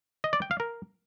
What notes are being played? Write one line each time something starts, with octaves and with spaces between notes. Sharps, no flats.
D#5
D5
G5
F5
A#4